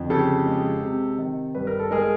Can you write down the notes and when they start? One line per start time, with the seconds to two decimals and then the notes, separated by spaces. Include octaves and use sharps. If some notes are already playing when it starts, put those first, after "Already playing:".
Already playing: F2 D3
0.10 C#3 G4 A4
0.46 G#3
0.82 C3
1.18 D#3
1.55 G2 B4
1.67 A#4
1.79 A4
1.91 G#3 G#4 A#4